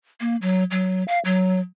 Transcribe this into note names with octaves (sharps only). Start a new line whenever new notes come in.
A#3
F#3
F#3
F5
F#3